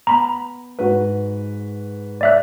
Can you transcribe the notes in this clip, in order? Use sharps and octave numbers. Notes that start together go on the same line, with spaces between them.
B3 A#5 B5
G#2 F#4 B4
D5 E5 F#6